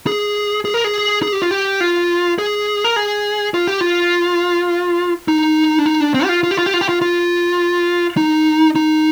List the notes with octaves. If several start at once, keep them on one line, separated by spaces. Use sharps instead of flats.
G#4
G#4
A#4
G#4
G#4
G4
F4
G4
F4
G#4
A#4
G#4
F4
G4
F4
D#4
D4
D#4
D4
C4
G4
F4
F4
G4
F4
G4
F4
G4
F4
F4
D#4
D#4